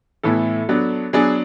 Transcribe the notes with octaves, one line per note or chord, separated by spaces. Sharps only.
A2 E3 B3 E4 A4
F#3 B3 D4
F#3 B3 D4 G#4